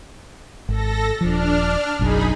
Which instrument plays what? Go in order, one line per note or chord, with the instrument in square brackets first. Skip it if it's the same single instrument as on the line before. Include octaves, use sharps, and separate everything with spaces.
[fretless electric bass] G#1 [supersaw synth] A4 A#6
[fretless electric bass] D#1 F3 [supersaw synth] D4 F6
[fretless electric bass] F#1 B1 F#2 [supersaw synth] D#4 G#4 B5